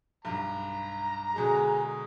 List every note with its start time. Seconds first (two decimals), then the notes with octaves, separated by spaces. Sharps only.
0.25 B1 G2 A#5
1.36 B2 D3 G#3 G#4